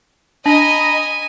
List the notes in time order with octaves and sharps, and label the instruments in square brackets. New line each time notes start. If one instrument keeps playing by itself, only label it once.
[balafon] D4 [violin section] D#5 [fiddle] G#5 [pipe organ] A#5 B5